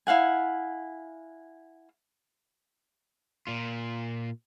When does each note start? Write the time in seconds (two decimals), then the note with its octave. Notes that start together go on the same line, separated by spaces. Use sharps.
0.07 E4 F5 F#5 G#5
3.47 A#2 F4